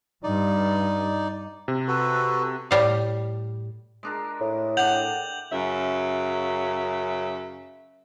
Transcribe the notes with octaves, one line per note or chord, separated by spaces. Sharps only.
G2 D#4 D5
C3
F#4 A4 B4
A2 G3 F5
G#3 D4 A#4
A2
D4 F#5 G5 G6 F7 F#7
F#2 C#3 E5